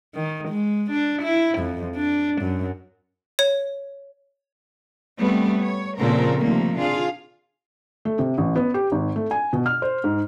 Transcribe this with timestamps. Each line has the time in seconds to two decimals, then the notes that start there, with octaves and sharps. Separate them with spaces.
0.15 D#3
0.49 G#3
0.91 D4
1.23 E4
1.59 F2
1.97 D4
2.42 F#2
3.39 C#5
5.18 G3 A3 B3 C4
5.60 C#5
5.98 F2 A#2 C#3 C4 A4 A#4
6.39 C3 D#3 F3 G3 A3 A#3
6.78 D4 F4 G#4 F5
8.05 A3
8.19 C3
8.38 A1
8.56 B3
8.74 G4
8.92 G#1
9.16 A3
9.31 G#5
9.53 B2
9.66 F6
9.82 C5
10.04 G#2